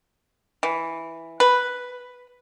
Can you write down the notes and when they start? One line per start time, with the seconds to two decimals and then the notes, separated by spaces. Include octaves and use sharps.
0.63 E3
1.40 B4